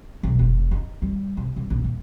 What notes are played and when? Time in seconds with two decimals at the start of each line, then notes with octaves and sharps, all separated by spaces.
0.23 B1
0.39 F1
0.71 D#4
1.02 G3
1.37 C3
1.56 G2
1.70 A#1
1.84 D#1